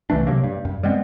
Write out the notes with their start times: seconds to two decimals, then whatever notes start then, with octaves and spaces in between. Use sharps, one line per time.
0.10 C2 E3 A3 D4
0.27 C3 F#3 A#3
0.44 G2
0.65 F#2
0.83 G3 G#3 B3 C4